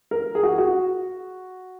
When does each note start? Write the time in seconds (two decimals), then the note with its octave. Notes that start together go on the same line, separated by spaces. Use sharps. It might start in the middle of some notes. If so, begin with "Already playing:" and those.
0.11 A#4
0.35 G#4
0.43 F#4
0.50 G#4
0.58 F#4